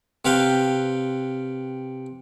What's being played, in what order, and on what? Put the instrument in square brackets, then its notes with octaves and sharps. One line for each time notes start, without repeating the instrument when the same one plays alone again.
[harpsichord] C3 B4 F5 G5